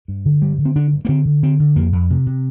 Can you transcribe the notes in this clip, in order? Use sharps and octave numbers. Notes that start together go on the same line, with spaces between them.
G2
D3
G2 G3
D3
C4
D3 D4
G2
A#3
D3 C4
D3
D3 C4
D3
F2 A#3
F2
C3
C3